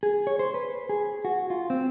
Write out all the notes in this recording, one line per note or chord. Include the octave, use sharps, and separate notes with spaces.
G#4
C#5
C5
B4
G#4
F#4
F4
C4